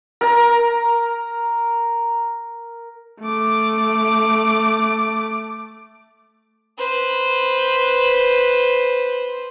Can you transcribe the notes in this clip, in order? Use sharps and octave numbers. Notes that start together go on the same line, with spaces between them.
A#4 A#5
A3 D6
B4 C5